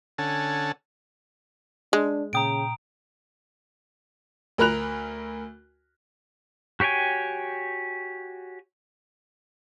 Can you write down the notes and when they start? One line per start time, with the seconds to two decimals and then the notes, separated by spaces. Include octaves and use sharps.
0.18 D3 C#4 A4 F#5 G#5 A5
1.93 G#3 D4
2.33 A#2 C#3 G5 A#5 D#6 D7
4.58 D2 A#4 B5 F#6 F7
6.80 F#4 G4 C#5 G5 G#5